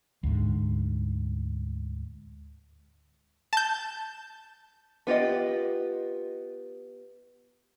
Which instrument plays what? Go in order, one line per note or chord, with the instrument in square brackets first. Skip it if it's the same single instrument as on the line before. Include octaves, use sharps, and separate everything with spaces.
[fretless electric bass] D2 G#2
[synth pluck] A5 G6
[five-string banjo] B3 F4 G4 D#5